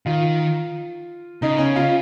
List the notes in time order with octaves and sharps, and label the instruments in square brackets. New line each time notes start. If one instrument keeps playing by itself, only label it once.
[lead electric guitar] D#3 [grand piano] F4
[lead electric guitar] C#3 [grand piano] D#4
[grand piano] C#4
F4